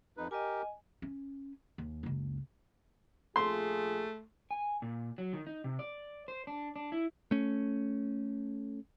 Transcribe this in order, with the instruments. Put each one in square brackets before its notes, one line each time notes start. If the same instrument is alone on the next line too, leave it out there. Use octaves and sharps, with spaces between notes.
[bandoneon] F2 D#4 B4
[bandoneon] G4 A#4 [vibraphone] D#5 G#5
[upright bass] C#4
D#2
F#1 C#2
[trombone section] A#1 F4 G#4 [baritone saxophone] A3 [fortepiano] C6
[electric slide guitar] G#5
A#2
F#3
D#3
D#4
C3
D5
C5
D4
D4
E4
[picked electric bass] A3 C#4